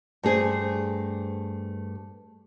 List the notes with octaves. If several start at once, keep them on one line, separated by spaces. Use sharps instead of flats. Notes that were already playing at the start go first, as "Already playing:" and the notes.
G2 A3 G#4 C5